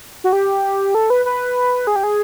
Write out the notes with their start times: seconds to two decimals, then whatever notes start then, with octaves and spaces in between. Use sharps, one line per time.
0.24 F#4
0.33 G4
0.95 A4
1.10 B4
1.25 B4
1.87 G#4
1.96 G4
2.03 G#4